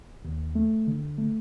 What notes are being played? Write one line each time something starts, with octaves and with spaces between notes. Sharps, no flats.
D#2
A3
D3
A3